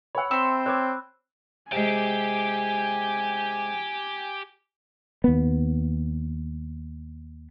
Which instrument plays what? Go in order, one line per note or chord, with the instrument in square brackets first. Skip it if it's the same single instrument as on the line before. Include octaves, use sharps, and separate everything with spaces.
[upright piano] C#5 F#5 [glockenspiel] B5 E6
[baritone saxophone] C4 [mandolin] E5 C6 [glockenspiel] E6
[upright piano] C#5 D6 G#6 [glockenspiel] F#6
[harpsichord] C3 G#3 [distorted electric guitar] G4 G5 [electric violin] G#5
[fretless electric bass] D#2 B3